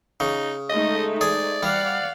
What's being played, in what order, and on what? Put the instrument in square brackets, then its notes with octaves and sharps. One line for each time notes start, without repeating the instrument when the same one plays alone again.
[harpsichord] C#3 [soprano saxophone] D#4
[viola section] G#3 A3 D#4 [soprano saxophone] D#5
[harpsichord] G#4 [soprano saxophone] D5
[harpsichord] G3 [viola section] F5 F#5